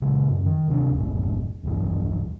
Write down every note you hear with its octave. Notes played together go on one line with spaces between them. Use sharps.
A#2 C#3 G#3
F#2
D#3
D1 C3 D4
E1 B1 F#2 A2
D1 B1 E2 G2